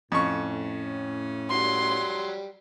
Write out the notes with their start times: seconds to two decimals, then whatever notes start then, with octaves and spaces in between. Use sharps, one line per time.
0.12 F2 A2 C#4 C#6
1.50 F#3 G3 C6